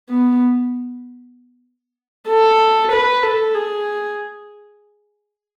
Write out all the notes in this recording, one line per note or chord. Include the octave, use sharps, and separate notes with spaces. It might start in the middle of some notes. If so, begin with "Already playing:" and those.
B3
A4
B4
A4
G#4